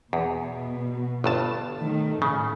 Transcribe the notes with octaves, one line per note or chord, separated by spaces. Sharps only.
E2 B2
G1 G2 A5
D#3 A3
A2 C#3